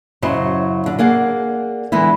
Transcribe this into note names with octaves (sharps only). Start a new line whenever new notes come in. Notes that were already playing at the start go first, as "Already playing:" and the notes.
F#2 C#3 F#3 E4 C5 D#5
D3
A#3 G#4 D5 F#5
D3 E3 G#3 B3 E4